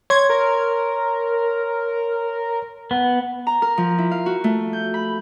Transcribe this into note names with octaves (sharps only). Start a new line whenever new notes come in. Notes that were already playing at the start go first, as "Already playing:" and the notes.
C#5 C6 G#6
A#4
B3
A#5
A#4
F3
E4
F5
F#4
A3
G6
B5